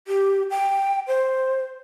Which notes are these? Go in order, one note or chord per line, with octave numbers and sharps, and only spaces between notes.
G4
G5
C5